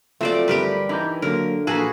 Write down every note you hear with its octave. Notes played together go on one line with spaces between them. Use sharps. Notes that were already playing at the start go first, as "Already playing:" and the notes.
F3 F#3 A3 C4 F4 C5 D5
G1 G3 G4 A#4 B4
G2 E3 D#4 B5 D6 G6
D3 F#3 A#3 A#4
A#1 E3 A#3 F#4 G#4 A4 B4 F5